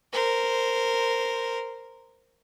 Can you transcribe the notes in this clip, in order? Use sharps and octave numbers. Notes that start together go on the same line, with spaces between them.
A#4 C5